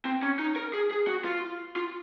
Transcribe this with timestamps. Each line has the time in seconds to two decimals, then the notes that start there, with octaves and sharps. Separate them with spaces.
0.05 C4
0.23 C#4
0.39 D#4
0.56 A#4
0.73 G#4
0.91 G#4
1.07 F#4
1.25 F4
1.76 F4